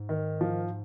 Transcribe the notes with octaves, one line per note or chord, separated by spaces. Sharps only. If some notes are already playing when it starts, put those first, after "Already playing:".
Already playing: G#2
D#3
F3